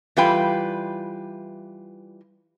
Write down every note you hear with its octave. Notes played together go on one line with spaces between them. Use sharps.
E3 G3 F4 B4 G5